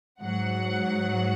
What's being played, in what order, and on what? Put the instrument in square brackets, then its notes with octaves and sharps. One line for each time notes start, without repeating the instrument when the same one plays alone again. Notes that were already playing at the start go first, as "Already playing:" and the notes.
[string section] G#2 F#3 F#5